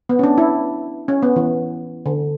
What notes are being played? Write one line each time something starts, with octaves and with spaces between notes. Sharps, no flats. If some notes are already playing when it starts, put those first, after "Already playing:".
B3
C#4
D4
E4
C#4
B3
E3
D3